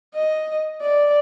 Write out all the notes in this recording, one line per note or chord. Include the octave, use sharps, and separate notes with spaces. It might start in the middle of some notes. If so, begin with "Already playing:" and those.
D#5
D5